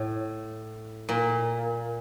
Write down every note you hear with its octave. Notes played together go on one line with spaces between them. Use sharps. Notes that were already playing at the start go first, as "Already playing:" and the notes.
Already playing: A2
A#2